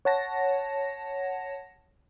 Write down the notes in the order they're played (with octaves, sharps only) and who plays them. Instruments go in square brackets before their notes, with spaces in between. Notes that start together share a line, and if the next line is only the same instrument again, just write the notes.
[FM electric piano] C#5 F#5 A5 A#6